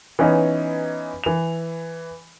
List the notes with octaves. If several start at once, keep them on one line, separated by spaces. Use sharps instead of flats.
E3 B3 C#4 D#4
E3 F7